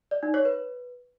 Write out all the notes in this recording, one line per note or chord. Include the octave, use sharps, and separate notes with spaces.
D5
D#4
C#5
B4